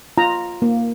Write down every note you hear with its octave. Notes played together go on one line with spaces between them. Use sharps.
F4 A#5
A#3